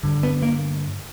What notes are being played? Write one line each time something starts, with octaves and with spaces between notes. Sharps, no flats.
G2 D3
B3
A#3